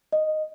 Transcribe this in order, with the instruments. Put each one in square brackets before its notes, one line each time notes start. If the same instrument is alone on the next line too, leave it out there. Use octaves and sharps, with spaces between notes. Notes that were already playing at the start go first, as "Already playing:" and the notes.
[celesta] D#5